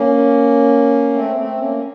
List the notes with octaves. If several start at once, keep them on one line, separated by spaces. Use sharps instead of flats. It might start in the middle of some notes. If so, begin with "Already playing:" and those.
Already playing: A#3 C#4
A3 C4
A3 C4
A#3 C#4